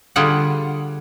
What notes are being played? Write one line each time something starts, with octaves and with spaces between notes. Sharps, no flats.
D3 G3 F4 G#4 D5 F#5